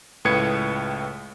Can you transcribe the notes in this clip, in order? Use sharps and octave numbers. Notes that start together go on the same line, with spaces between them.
C#2 A2 B4 D#6 G#6 C#7